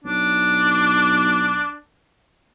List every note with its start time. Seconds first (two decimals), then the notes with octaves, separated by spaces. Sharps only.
0.04 B1 D4